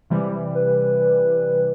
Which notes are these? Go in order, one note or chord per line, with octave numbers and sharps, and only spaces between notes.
C3 E3 G3
B4